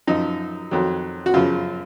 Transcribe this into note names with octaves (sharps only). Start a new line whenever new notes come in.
F#2 F3 D#4
F2 D#3 F#3
F#4
F#2 C#3 F3 F4